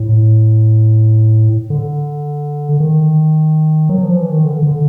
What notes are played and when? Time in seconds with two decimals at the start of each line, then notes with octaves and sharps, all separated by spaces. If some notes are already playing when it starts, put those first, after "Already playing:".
Already playing: A2
1.70 D3
2.80 D#3
3.89 F#3
4.04 F3
4.17 E3
4.31 D#3
4.45 D3
4.63 D3